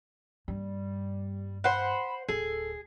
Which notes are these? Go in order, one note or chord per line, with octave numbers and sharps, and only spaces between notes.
G2 G3 A#3
C5 F#5 B5
D1 G#4 A4